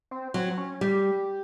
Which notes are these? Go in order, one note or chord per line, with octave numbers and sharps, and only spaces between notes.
C4
F#3 C4
C#4
G3 G4